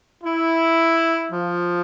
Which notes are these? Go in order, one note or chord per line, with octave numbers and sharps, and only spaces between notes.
E4
F3